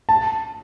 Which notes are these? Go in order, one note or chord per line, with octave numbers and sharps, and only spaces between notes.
A5